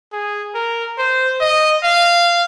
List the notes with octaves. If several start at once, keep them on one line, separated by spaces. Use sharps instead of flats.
G#4
A#4
C5
D#5
F5